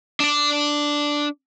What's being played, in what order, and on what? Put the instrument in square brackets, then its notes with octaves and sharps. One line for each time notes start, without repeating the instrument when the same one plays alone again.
[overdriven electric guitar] D4 D5